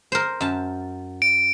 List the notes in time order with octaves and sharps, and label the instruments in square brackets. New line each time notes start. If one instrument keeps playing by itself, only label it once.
[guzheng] A#4 C5
F#2 A5
[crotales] D7